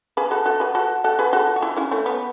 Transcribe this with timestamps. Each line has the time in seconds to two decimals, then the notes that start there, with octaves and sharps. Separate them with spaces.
0.17 G#4 B4
0.31 F#4 A4
0.46 F#4 A4
0.60 G#4 B4
0.75 F#4 A4
1.04 F#4 A4
1.19 G#4 B4
1.33 F#4 A4
1.56 F#4
1.62 E4 G#4
1.77 C#4 E4
1.91 A3 C#4
2.06 B3